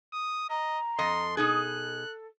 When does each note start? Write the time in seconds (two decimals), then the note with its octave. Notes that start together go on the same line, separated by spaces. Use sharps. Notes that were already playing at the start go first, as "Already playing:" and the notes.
0.13 D#6
0.50 D#5 A#5
0.99 F2 A4 D#5 C6
1.37 B2 D#4 G#4 A4 F#6